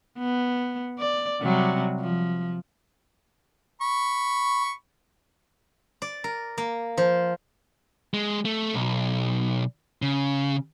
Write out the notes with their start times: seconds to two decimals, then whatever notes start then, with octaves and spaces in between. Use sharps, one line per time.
0.18 B3
0.99 D5
1.42 C3 F#3 G3
2.00 F3
3.82 B5 C#6
6.02 D5
6.24 A#4
6.58 A#3
6.97 F3
8.14 G#3
8.45 A3
8.74 B1
10.02 C#3